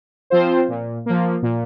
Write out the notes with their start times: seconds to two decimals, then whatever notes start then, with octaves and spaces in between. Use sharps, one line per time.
0.30 F3 C4 F4 C5
0.69 A#2
1.06 F3 A#3
1.42 A#2